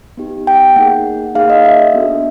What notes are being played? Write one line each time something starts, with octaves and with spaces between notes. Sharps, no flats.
B3 D#4 G4
G5
A#3 D#4 G#4 F#5
A#3 D#4 G#4 F5
D#5
E5
E5
B3 D4 F#4 A4